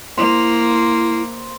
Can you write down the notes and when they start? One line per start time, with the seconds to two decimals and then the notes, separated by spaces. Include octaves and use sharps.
0.17 A#3 E4 C5